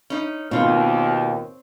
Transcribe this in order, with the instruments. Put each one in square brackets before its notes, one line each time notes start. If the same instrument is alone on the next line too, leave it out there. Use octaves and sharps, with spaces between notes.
[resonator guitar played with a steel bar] C#4 D#4
[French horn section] D#2 [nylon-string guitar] B2 F4 [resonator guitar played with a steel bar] C4 C#5